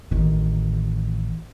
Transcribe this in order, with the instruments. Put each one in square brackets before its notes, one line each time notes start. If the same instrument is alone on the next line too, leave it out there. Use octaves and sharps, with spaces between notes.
[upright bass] A1 D#3